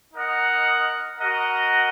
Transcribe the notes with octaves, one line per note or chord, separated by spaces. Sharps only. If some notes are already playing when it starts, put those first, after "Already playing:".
D#4 A#4 D#5 F#5
F#4 A#4 D#5 F#5